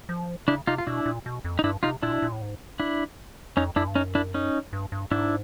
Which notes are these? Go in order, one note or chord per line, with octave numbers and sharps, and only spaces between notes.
F3
C#3 D4 E4
C3 D#4 F4
F4
B2 D4 E4
A#2
B2
F2
D#4
G2 D4 E4
C3 D#4 F4
A#2 D4 E4
B2
A#2
A2
G#2
D4 E4
F2 C#4 D#4
F#2 D4 E4
G2
F#2 C#4 D#4
D4 E4
C#4 D#4
G2
G2
G#2 D4 E4